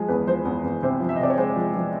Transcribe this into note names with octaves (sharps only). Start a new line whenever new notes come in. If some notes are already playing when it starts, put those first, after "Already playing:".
Already playing: F3 G#3 G#4
E2 B4
F3 C5
E2
E2
C3 C5
F3
E5
D#5
C3 D5
C#5
G#3 C5
F3
F3